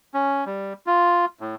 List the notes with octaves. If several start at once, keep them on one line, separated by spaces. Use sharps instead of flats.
C#4
G3
F4
A2